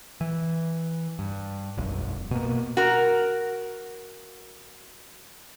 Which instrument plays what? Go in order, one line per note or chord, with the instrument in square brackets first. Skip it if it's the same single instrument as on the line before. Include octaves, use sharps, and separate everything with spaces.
[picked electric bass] E3
G2
E1 B1 F#2
B2 A#3
[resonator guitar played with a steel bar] F#4 A#4